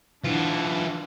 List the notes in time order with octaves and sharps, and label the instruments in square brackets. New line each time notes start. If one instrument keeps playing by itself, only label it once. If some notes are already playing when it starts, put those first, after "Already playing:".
[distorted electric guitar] E3 F4 [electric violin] D4 F#5